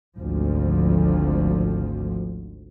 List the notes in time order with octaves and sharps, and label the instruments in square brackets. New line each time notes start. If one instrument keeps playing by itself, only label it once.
[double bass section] G#1 D2 F3